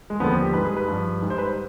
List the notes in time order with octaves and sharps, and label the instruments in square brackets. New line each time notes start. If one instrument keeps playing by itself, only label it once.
[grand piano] G#3
D#2 D3 F3 B3
C4
G4
G#2 G3 B4
G#4
B4
G2 F3
G#2 G3
C5
B4
C5